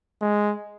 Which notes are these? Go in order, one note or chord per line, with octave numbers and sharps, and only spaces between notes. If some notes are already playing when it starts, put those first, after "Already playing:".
G#3